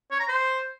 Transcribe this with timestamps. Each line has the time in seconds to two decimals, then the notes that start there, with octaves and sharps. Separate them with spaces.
0.11 C#5
0.20 A#5
0.28 C5